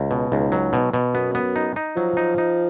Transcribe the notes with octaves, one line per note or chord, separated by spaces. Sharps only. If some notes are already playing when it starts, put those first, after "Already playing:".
Already playing: C#2
B2
C#2 G#2
F#3
B2
B2
F#2 B3
B3
D#4
D#4
F3 F#3
D#4
D#4